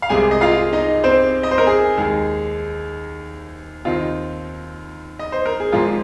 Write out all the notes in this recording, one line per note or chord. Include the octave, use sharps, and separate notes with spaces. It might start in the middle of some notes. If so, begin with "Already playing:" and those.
F5
C2 C3 G#3 C4 G#4 G#5
D#5
F4 F5
D#4 D#5
C4 C5
D#5
C5
A#4
G#4
D#2 D#3 G#3 D#4
D#2 D#3 C4 D#4 F4
D#5
C5
A#4
G#4
G#1 G#2 F3 G#3 F4